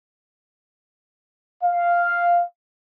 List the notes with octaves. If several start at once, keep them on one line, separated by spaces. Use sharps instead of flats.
F5